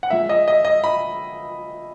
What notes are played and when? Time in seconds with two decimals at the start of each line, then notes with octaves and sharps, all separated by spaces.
0.03 F#5
0.10 A#2 G#3 E5
0.29 D#5
0.48 D#5
0.65 D#5
0.84 B5